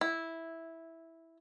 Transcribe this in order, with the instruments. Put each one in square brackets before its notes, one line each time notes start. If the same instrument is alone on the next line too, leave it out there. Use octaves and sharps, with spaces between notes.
[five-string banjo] E4